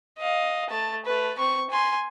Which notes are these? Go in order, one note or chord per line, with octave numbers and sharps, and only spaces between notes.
D#5 F5
A3 A5
A3 B4
C4 C#6
G#5 C6